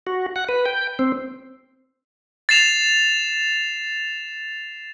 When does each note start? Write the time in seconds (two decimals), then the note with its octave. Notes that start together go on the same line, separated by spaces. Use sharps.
0.07 F#4
0.36 F#5
0.49 B4
0.66 G5
0.99 C4
2.49 A6 C7 E7 F7